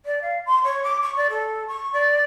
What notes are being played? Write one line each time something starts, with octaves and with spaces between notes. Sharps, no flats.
D5
F5
C6
C#5
D6
C#6
D5
A4
C#6
D5